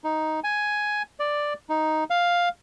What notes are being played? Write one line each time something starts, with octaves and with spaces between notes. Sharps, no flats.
D#4
G#5
D5
D#4
F5